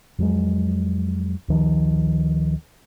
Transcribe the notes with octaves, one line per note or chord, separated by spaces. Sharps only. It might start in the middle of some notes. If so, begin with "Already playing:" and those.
F2 F#3 G#3
D2 D#3 F3